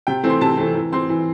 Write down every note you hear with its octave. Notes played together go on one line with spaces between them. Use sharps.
C3 G5
E3 A3 C4
C6
C3 A5
E3 A3 C4
E3
C4 C6
E3